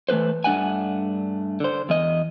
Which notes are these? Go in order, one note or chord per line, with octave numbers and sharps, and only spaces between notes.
E3 A3 C#4 B4 C5
G2 A3 D4 D#5 F#5 G#5
D3 C5
E2 E3 D#5